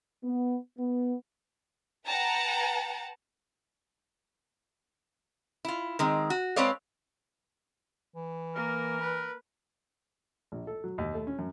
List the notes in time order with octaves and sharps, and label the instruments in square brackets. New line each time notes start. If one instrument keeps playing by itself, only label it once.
[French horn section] B3
B3
[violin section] B4 F#5 G5 A5 A#5
[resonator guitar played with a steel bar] E4 F4
D#3 G#3 C4
F#4
G#3 C4 B4 C#5 D5 F5
[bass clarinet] E3
[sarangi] A#3 [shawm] A#4
[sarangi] B4
[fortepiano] A#1
A4
F#3
D#2
A3
C#4
F#2